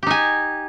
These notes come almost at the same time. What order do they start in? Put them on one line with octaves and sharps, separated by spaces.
G4 D#4 G#5